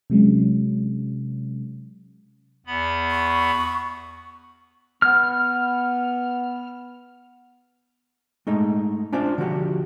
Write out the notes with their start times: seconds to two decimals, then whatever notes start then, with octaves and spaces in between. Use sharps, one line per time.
0.10 C3 F#3 G#3 C#4
2.66 E2 B3 B5
3.11 C#6
5.02 B3 F6
8.47 G#3 A3 D#4 D#5
9.13 C#4 D4 F4 C5 D5
9.38 D3 F3 F#4 G4